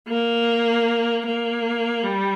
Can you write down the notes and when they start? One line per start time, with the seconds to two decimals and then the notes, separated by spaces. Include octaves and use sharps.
0.09 A#3
1.26 A#3
2.04 G3